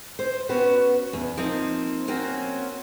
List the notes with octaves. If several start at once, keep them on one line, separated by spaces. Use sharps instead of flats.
C5
B3 C#4 F#4 B4
E2
F3 A#3 C4 D#4
A#3 C4 C#4 F#4